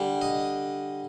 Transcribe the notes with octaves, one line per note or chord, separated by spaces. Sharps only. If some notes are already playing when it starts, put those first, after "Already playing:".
Already playing: D3 G3
D#5